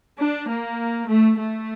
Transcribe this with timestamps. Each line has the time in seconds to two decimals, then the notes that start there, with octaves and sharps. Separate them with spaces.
0.19 D4
0.48 A#3
1.08 A3
1.38 A3